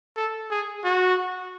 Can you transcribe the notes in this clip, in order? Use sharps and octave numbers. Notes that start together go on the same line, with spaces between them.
A4
G#4
F#4